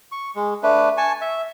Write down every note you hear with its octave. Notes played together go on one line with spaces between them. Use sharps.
C#6
G#3
A3 D4 B4
G#5 A5 C#6
E5